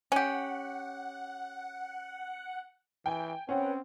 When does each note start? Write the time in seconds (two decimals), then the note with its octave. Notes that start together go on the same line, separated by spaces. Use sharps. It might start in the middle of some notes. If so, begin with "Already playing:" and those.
0.12 C#4 G4 F#5
3.06 E3 G5 G#5
3.49 C4 C#4 B4 C#5 F#5 G5